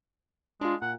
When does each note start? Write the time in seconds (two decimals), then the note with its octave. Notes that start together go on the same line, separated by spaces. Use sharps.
0.61 G#3 D4 F4
0.82 A#2 F#5